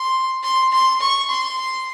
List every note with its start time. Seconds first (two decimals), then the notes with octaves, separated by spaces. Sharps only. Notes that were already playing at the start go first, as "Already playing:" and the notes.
Already playing: C6
0.43 C6
0.72 C6
1.01 C#6
1.30 C6